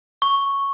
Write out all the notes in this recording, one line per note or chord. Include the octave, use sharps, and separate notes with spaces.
C#6